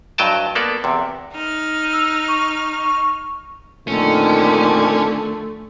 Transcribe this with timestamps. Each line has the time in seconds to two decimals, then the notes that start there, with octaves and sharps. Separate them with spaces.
0.18 G2 F#3 D#5 G5 A5
0.55 A#3 B3 A4 D5
0.84 E2 C3
1.35 D#4 F6
1.93 E6
2.28 C#6
3.88 F2 A#2 D3 D#3 A3 C#4